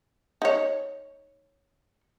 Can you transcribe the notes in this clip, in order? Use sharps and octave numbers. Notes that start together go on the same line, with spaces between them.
D#4 C#5